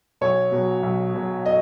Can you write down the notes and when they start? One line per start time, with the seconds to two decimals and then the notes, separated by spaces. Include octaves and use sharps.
0.21 B1 C#5
0.52 B2 F#3
0.83 B1
1.14 B2 F#3
1.46 D#5